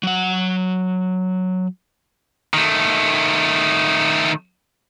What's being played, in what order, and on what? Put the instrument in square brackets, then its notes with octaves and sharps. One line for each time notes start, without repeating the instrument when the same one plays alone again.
[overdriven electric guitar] F#3 F#5
[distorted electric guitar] D#3 A3